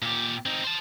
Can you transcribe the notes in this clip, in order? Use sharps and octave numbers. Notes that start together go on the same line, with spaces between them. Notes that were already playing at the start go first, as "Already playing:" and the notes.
A#2 G4
C4 D#4
C5 A5